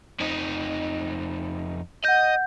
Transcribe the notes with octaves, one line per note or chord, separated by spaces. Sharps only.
F2 D#4
D#5 F#5 G6